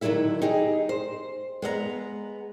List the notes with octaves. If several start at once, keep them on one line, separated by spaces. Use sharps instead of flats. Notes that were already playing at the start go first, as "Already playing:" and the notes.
D3 D#3 F#3 A3 E4 E5
D#4 G4 G#4
C5
G#3 B3 D#5 A#5